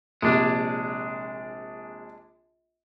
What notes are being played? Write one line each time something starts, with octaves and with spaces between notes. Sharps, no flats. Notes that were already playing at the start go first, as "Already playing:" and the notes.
A#1 C3 G#3 D4